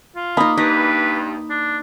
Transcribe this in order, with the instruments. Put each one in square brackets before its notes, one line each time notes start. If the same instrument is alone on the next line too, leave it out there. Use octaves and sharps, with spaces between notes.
[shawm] F4
[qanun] A#3 D#4 [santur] B5 D#6
[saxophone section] G2 [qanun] D#4 [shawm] B4
[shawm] D4